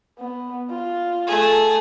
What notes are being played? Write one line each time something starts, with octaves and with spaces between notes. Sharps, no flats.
B3
F4
A3 G#4